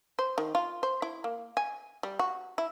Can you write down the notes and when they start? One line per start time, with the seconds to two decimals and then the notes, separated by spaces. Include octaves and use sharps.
0.19 C5
0.38 D#3
0.55 F4
0.83 C5
1.02 E4
1.24 A#3
1.57 G#5
2.03 G3
2.19 F#4
2.58 E4